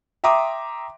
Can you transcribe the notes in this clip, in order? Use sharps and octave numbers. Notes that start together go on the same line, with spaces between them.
E5 G5 A#5 C6 D6 D#6